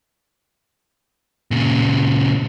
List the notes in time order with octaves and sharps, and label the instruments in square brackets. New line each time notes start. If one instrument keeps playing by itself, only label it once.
[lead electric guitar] A#2 C#3